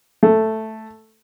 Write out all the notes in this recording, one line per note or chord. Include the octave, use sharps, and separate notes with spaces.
A3